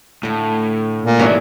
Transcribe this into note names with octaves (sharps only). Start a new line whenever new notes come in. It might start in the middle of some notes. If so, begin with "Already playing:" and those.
A2 D3 A3
A#2
G#2 D#3 F#3 B3 C#4 D4 E4 G4